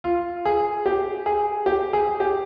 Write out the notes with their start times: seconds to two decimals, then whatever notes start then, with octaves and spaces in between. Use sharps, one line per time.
0.04 F4
0.45 G#4
0.86 G4
1.26 G#4
1.66 G4
1.93 G#4
2.20 G4